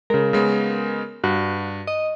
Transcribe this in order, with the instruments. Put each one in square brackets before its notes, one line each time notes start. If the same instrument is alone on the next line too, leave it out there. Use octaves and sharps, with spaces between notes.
[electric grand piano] C#3 G#3 [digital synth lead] A#4
[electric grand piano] C#3 G#3 B3
[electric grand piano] G2 [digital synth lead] F#4
[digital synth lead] D#5